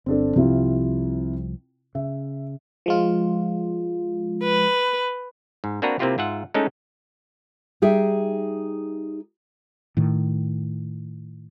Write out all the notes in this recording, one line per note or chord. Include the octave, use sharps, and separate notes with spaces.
G1 C4 D4 A4
C2 C3 F3 E4 F4
C#3 E5
F3 G#3 F4
B4
G#2
A#3 C4 D4 F#4 B4 A#5
C3 A#3 C4 E4 F4 G4
G#2 F4 E5 F#5
G#3 A3 C#4 D#4 E4 A4
G3 D#4 G#4 E5 G5
A2 D#3